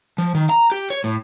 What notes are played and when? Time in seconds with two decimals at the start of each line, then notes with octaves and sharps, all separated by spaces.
0.18 F3
0.35 D#3
0.49 A#5
0.72 G4
0.90 C#5
1.04 A2